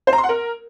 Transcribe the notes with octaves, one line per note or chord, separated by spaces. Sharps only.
C5
A#5
C6
F#5
A#4